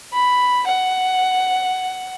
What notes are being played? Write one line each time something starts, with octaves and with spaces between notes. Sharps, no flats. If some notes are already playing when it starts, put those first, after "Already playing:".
B5
F#5